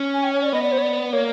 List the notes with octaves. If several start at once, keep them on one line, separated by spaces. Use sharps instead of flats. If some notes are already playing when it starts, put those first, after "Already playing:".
Already playing: C#4
G#5
G5
C#5
D5
B3 D#5
D5
C5
C#5
D5
A#3 C#5